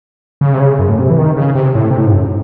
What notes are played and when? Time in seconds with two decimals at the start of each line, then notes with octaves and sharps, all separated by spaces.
0.41 C#3
0.54 C3
0.60 C#3
0.79 F#2
0.89 A2
0.99 C3
1.10 E3
1.18 D#3
1.37 C#3
1.55 C3
1.75 A2
1.91 C3
1.98 A2
2.05 G#2
2.12 F#2